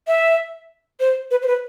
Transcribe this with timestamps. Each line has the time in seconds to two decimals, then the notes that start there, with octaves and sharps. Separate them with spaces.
0.07 E5
1.00 C5
1.31 B4
1.42 C5
1.48 B4